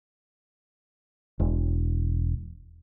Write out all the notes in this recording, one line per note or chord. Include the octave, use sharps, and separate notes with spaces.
E1